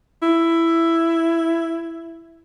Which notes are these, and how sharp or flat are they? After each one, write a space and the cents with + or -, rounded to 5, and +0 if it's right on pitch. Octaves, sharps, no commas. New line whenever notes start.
E4 +10